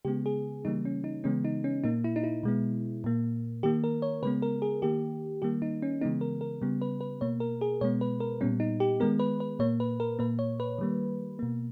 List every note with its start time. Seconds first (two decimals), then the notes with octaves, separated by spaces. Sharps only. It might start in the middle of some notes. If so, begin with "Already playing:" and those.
0.05 C#3 G#3 B3 G4
0.26 G#4
0.65 C#3 E3 G3 A#3 D#4
0.85 C#4
1.04 D#4
1.24 C#3 E3 G#3 B3 C#4
1.45 D#4
1.64 C#4
1.84 A#2 A#3 D#4
2.04 E4
2.16 D#4
2.24 E4
2.43 B2 G#3 B3
3.04 A#2 A#3
3.63 D#3 A#3 G4
3.84 A#4
4.02 C#5
4.23 C#3 G#3 B3 B4
4.42 A#4
4.62 G#4
4.82 D#3 A#3 G4
5.42 D#3 G3 A#3 G4
5.62 D#4
5.82 C#4
6.01 C#3 E3 G#3 B3 D#4
6.21 A#4
6.41 A#4
6.62 C#3 G3 B3
6.82 B4
7.01 B4
7.21 B2 A#3 C#5
7.40 A#4
7.61 G#4
7.81 B2 G#3 B3 C#5
8.01 B4
8.20 A#4
8.41 A#2 G3 B3 C#4
8.60 D#4
8.80 G4
9.00 D#3 G#3 B3 A#4
9.19 B4
9.40 B4
9.59 A#2 A#3 C#5
9.80 B4
10.00 A#4
10.19 A#2 A#3 B4
10.39 C#5
10.60 B4
10.79 D#3 G3 A#3
11.39 B2 A#3